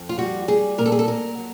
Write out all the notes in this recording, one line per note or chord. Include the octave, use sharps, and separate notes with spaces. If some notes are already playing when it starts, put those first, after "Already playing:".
Already playing: F2
F4
G3 F#4
G3 G#4
A#2 A#4
A4
G#4
A4
A#2 A#4
F#3